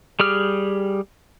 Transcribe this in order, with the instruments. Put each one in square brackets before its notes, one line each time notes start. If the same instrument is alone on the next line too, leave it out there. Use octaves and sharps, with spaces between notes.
[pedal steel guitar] G3 G4 G#4 F6